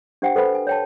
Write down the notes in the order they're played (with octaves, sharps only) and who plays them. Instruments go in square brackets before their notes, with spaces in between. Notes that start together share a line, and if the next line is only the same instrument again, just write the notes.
[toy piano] D4 G4 C5 F#5 G5
A4 B4 C5 F#5 G#5 B5
G#5
C#5 G5 A5